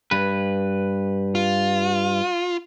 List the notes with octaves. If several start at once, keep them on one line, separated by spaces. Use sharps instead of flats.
G2 B4
F4